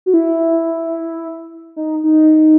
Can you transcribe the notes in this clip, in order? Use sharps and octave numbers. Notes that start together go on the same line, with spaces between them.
F#4
E4
D#4
D#4